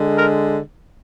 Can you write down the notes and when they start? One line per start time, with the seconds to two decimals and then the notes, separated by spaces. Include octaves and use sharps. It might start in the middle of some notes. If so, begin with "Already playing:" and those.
Already playing: D3 G#3
0.16 A#4